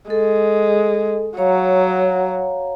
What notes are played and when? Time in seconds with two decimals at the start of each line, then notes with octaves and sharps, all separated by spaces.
0.10 G#3 A4
1.37 F#3 C#5 F5 A#5